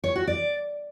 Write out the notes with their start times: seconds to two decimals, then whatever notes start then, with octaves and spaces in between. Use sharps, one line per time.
0.04 C#5
0.15 F#4
0.27 D5